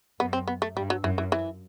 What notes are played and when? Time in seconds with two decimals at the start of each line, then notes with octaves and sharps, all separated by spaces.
0.20 F#2 B3
0.33 C4
0.48 B3
0.62 A3
0.76 G2 G3
0.90 F#3
1.04 F#2 E3
1.18 E3
1.32 E3